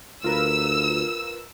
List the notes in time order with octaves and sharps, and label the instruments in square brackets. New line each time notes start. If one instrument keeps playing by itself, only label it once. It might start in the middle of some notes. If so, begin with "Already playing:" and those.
[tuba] D2 [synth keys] F4 A#4 B4 [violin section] E6